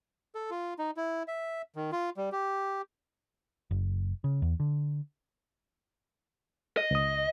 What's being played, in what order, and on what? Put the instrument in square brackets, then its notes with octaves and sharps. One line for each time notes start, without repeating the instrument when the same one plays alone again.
[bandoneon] A4
F4
D#4
E4
E5
D#3
F4
G3
G4
[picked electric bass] F#1
C#3
E2
D3
[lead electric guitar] D#5
[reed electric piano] C#2 D#6